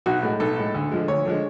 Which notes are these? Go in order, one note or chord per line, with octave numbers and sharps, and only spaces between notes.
B1 F#4
A2 G#3
B1 A4
A2 G#3
D2
D3 F3 G#3
D2 C#5
D3 F3 G#3